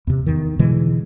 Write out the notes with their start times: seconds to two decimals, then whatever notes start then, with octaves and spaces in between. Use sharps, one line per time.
0.07 E2 C3
0.26 E2 D#3
0.59 B2 D3 E3 G#3